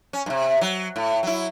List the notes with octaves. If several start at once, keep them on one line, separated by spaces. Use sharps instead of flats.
C#4
G2 C3
F#3
A2
F#3 E4